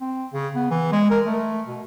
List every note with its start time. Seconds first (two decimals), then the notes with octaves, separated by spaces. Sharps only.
0.01 C4
0.33 C#3
0.55 B3
0.71 E3
0.92 G#3
1.11 A#4
1.26 A3
1.67 B2